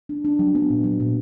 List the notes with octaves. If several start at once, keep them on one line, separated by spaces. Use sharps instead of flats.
D4
D4
F#3
B3
A#2
F#3
A#2